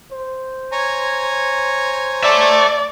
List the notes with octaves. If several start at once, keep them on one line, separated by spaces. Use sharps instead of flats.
C5
C#5 G#5 A#5
D5 E5 A5